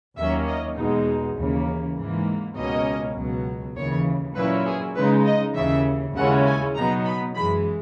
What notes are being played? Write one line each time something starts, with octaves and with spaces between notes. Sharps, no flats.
D#2 D#3 F#3 A#3 C#4 E5
D#5
E2 B2 G#3 D#4
D#2 C#3 E3 A#3
G#2 E3 A#3
C#2 B2 A#3 C#4 D#5
C#2 B2 F#3
D#2 C#3 E3 C#5
A#2 F#3 C#4 E4 B4
G#4
C#3 G#3 D#4 B4
D#5
D#2 C#3 E3 E5
D#2 C#3 G#3 C#4 E4 F#5
G#5
B2 F#3 B3 D#4 A#5
B5
F#2 E3 G#3 B5